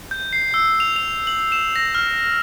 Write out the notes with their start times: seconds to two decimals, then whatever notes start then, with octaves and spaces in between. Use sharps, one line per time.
0.11 G6
0.33 C7
0.54 E6
0.80 F7
0.96 F7
1.27 F#7
1.52 E7
1.76 A#6
1.95 F6